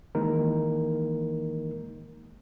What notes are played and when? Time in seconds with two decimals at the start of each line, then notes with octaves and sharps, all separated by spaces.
0.15 D#3 E3 G#3 A#3 D#4 A#4